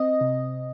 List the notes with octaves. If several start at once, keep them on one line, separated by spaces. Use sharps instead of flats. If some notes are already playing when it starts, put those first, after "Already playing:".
Already playing: C4 D#5
C3